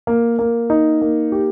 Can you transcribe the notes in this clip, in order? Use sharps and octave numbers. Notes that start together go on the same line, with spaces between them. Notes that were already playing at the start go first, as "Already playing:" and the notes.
A#3
A#3
D#4
A#3
G4